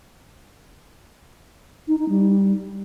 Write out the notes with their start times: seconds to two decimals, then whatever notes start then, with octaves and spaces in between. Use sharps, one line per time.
1.88 D#4
1.98 D#4
2.09 G3